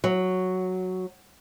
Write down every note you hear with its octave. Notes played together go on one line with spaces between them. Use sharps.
F#3